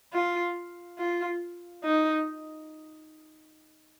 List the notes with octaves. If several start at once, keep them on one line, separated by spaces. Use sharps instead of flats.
F4
F4
D#4